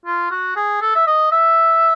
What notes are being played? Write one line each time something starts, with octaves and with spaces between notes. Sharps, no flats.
F4
F#4
G#4
A4
E5
D#5
E5